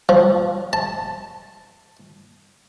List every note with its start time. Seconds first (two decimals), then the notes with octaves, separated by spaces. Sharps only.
0.09 F3
0.73 A5